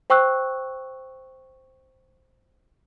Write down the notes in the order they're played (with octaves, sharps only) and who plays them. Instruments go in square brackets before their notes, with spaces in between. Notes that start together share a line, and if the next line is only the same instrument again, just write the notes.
[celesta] C5 G5 C#6 E6 F#6